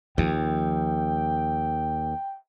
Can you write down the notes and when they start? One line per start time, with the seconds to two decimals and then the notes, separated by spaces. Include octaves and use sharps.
0.18 D#2 F3 G5